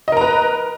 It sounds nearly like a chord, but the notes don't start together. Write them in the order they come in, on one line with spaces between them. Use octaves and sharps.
D#5 A#4 A#5 B4